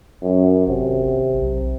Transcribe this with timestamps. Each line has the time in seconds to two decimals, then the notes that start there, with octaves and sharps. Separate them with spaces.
0.22 F#2
0.67 G#1 C3
1.01 G#1
1.41 B1